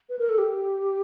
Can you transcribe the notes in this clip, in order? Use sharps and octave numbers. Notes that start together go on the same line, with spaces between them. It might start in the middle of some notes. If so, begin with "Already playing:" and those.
B4
A#4
A4
G4